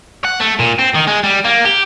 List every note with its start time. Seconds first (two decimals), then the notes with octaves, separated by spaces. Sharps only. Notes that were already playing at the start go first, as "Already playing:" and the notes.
0.24 F#5
0.40 A3
0.59 A#2
0.79 C4
0.95 D#3
1.08 G#3
1.23 G3
1.45 A#3
1.65 G4